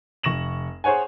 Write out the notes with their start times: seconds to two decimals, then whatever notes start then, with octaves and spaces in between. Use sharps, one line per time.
0.23 F1 C#6 A#6 E7 F#7
0.84 G#4 C5 C#5 F#5 G#5